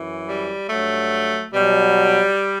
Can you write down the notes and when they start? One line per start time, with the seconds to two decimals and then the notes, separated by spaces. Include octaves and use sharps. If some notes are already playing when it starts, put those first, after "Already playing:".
Already playing: F#2 E3
0.26 G3
0.68 G2 F#3 A3
1.53 B2 F#3 G3